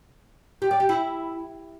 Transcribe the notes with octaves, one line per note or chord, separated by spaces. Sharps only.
G4
D5
G4
E4